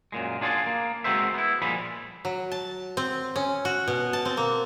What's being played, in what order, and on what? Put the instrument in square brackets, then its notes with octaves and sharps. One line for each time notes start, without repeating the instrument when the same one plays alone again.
[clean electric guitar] F#2 A#2 G#3
D4 F4 G#4 C5 D5
A#3
G#3 C4 F#4 A#4 C5 E5
B3 E4
A#2 F3 G3 G#3 B5
[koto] F#3
A5
C4
C#4
F#4
B2
A5
C4
A#3